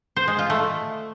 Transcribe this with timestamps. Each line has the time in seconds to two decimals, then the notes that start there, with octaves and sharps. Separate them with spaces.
0.16 C5
0.28 G#3
0.39 F4
0.50 A3